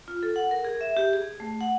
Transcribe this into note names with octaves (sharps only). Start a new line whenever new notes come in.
F4
A4
F#5
A#4
G#4
E5
G4
G#4
A3
F#5